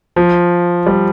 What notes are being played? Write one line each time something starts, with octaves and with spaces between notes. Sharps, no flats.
F3
G3